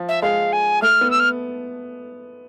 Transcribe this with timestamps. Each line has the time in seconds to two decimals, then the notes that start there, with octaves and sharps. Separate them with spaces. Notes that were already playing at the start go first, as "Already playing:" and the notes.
Already playing: F3
0.09 E5
0.22 G#3 F5
0.53 G#5
0.82 A3 F6
1.01 B3
1.10 E6
1.20 F6